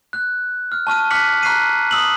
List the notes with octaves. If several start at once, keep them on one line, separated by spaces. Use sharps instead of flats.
F#6
F6
A5 C#6 F6 D#7
D6 F6 F#6 B6 C#7 F#7
A#5 C#6 F#6 B6 C7 D#7
D#6 E6 F#7